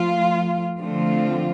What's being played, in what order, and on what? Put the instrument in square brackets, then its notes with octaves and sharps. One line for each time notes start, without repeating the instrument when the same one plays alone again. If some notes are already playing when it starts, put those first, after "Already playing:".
Already playing: [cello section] F3 A3 F4
D3 F3 A3 C4 F4